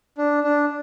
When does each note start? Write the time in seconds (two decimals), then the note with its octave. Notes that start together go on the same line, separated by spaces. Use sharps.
0.18 D4
0.43 D4